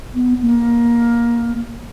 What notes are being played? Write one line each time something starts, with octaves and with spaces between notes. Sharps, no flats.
B3
A#3